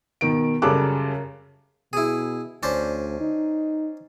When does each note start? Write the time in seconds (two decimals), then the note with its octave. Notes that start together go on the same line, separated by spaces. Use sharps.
0.21 B2 D#3 D7
0.62 F#2 C#3 G3 A4 D6 F#6
1.93 B2 E4 G#4
2.63 D2 C#4 D4 C5
3.20 D#4